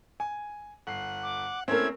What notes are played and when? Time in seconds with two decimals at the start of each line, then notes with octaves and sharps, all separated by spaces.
0.20 G#5
0.87 G1 F#5 C7
1.23 D6
1.68 A3 A#3 C4 C#4 E4 A#4 G#6